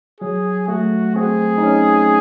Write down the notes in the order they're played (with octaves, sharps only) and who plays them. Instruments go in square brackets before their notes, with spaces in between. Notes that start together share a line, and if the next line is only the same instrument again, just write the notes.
[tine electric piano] F#3 [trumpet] G#4
[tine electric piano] A3 [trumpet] F#4
[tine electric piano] C4 [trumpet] G#4
[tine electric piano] D#4
C#4